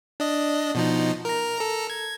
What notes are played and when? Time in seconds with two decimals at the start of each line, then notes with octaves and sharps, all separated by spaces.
0.20 D4 D#5
0.75 B2 F3 D#4
1.25 A#4 A#5
1.59 A4 A#5
1.90 G#6